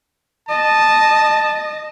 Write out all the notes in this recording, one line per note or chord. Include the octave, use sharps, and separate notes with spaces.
D#5 A5